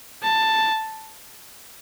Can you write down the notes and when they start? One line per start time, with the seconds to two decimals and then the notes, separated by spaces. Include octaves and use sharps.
0.23 A5